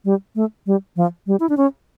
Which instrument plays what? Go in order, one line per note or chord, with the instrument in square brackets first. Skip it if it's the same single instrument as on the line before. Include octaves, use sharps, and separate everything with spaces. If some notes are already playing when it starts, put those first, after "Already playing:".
[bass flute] G3
A3
G3
F3
G3
E4
D4
C#4